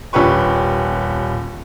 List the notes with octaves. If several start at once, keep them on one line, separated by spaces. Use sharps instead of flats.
D#1 C#4 G4 B4 C#6